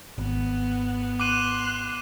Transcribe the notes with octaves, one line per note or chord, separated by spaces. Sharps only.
G#1 B3
C6 D6 F#6 D#7 E7